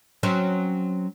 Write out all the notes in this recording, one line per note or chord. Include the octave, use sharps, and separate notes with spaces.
F#3 C4 C#4